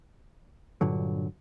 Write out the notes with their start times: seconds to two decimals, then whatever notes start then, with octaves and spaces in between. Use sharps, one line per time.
0.81 G2 A#2 D3 F#3